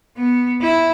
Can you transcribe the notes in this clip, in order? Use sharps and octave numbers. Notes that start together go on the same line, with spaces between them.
B3
E4